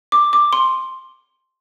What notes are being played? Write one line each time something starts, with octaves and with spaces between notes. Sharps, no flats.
D6
D6
C6